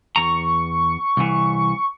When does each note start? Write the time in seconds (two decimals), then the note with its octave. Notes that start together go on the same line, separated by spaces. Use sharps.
0.16 E2 A#5 C#6
1.17 C2 E3